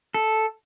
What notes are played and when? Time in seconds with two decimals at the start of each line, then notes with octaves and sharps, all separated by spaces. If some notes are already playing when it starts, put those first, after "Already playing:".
0.14 A4